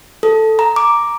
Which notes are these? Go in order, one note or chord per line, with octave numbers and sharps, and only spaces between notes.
A4
A#5
D6